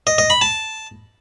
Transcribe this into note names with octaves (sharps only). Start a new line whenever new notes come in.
D#5
D#5
B5
A5